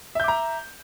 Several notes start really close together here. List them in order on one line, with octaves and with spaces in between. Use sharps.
E5 G6 D6 A#5